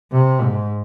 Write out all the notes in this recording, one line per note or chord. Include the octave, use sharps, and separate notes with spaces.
C3
G#2